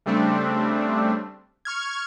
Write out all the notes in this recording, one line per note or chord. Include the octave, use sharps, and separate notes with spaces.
C#3 G3 A3 C4 D4
C#6 F6 G#6